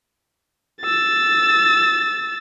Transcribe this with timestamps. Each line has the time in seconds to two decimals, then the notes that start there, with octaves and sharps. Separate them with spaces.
0.82 E6 A6